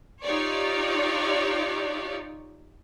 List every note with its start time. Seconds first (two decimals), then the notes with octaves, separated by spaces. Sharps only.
0.24 D#4 F4 G4 C#5 D5